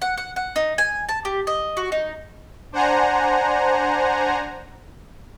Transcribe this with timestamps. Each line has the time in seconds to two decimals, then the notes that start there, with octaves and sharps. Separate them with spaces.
0.02 F#5
0.18 F#5
0.36 F#5
0.56 D#4
0.78 G#5
1.09 A5
1.25 G4
1.47 D#5
1.77 F#4
1.92 D#4
2.72 D4 C5 F#5 G#5 A#5